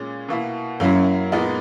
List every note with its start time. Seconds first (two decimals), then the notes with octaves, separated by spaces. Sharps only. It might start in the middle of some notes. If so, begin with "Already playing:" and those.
Already playing: A#2 G#3 C#4
0.29 B2 A#3 E4
0.80 F#2 F#3 A#3 C#4 E4 A#4
1.32 A#2 G#3 B3 D#4 A#4